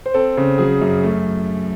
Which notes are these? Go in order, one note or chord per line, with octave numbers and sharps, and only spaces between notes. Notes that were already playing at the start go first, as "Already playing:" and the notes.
C5
C4 A4
C#3
F#3 G#4
F#2
A3